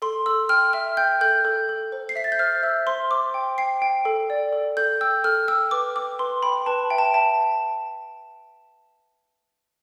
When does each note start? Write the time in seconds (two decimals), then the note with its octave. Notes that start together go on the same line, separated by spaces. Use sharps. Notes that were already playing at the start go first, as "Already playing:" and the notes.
0.02 A4 C6
0.26 A4 E6
0.49 G5 F6
0.73 E5 F6
0.97 G5 G6
1.21 A4 G6
1.45 A4
1.69 A4
1.92 C5
2.09 C7
2.16 E5 B6
2.24 A6
2.32 G6
2.39 C5 F6
2.63 E5 E6
2.87 C5 C6
3.11 C5 D6
3.34 G5
3.58 G5 C7
3.82 G5
4.05 A4
4.30 D5
4.53 A4
4.77 A4 G6
5.01 G5 E6
5.24 A4 F6
5.48 G5 E6
5.71 B4 D6
5.95 G5 D6
6.19 B4 C6
6.43 G5 B5
6.66 B4 A5
6.90 E5 G5
6.98 A5
7.14 E5 A5